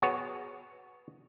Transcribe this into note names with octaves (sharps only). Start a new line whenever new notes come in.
B3 F#4 G#4 C#5